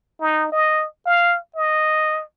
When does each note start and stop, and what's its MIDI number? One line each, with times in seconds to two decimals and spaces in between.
0.20 0.50 63
0.52 0.86 75
1.06 1.38 77
1.56 2.23 75